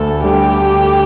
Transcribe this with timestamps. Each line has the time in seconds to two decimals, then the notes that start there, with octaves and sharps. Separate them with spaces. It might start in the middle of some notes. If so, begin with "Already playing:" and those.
Already playing: D2 A4
0.23 D3 G3 G4
0.61 D2